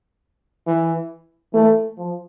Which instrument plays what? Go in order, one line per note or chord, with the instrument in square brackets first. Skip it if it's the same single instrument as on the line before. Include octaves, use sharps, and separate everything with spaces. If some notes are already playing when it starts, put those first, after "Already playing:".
[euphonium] E3
[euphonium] E3 [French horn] A3
[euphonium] F3